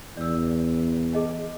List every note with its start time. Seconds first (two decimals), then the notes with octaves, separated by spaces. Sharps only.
0.17 E2 D5 E6
1.13 G#4 D#5 A5